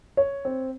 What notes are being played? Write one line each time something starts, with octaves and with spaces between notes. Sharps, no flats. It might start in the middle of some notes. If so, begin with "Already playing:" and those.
C#5
C4